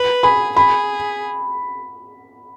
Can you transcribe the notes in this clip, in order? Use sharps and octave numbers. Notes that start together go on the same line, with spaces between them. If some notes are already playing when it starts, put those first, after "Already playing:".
Already playing: B4
G#4 B5
G#4 B5